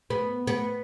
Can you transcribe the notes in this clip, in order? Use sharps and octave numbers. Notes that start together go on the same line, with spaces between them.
B3
B3